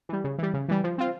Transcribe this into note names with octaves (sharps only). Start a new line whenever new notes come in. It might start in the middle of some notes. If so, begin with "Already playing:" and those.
E3 G3
C#3
E3 G3
C#3
E3 G3
F3
C4 F4